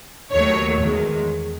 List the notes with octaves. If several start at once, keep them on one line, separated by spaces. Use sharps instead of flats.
D#2 D#3 F#3 A3 C#5
E2 D#3 G#3